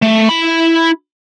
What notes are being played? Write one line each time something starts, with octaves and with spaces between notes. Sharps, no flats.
A3
E4 B5